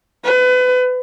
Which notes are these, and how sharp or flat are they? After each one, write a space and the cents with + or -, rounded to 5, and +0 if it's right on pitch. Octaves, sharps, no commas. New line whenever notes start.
B4 +30